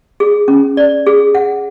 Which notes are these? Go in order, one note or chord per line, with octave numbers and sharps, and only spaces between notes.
G#4
C#4
D5
G#4
F#5